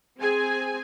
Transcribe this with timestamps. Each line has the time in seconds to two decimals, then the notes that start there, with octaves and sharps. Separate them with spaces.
0.19 C4 G#4 G#5